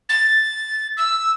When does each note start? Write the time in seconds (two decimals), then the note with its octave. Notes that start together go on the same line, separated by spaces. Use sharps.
0.09 A6
0.97 E6